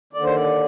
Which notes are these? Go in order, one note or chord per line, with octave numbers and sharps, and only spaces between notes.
D#2 D3 D5
C5
D5